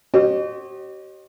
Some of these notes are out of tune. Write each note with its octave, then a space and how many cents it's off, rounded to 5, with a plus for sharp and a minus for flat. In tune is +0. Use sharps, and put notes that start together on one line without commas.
G4 -45 C5 +40 D#5 -35